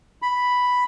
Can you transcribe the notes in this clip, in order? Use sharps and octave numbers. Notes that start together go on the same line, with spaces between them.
B5